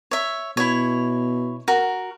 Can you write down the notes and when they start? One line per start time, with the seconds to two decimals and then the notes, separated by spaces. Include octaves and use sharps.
0.11 C#5 E5
0.57 B2 E4 C#5
1.68 F#4 A#4